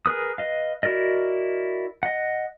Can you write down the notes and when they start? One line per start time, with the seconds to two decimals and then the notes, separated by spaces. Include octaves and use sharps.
0.06 G#4 A#4 B4 D#6
0.38 B4 D#5 F5
0.83 E4 F#4 A#4 D5 D#5
2.03 D#5 F#5